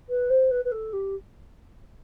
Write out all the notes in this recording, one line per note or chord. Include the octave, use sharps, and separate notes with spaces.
B4
C5
B4
B4
A4
G4